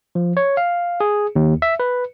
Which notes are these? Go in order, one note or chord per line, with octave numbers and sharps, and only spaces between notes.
F3
C#5
F5
G#4
D#2
E5
B4